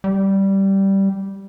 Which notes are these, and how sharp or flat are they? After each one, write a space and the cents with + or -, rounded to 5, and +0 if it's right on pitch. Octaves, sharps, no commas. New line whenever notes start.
G3 -10